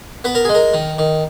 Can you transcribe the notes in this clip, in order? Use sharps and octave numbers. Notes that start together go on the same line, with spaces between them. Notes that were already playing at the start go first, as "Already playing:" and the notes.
B3 B4
A#4
G#3 G#4
A#4
D#3
D#3